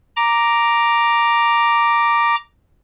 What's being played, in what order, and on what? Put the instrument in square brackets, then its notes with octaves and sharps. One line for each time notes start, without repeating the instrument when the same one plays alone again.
[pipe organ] A#5 D6